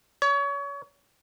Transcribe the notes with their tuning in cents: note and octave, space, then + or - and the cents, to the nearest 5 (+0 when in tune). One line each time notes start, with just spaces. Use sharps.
C#5 +30